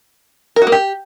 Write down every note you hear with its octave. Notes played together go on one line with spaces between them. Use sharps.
A#4
F#4
A#3
G4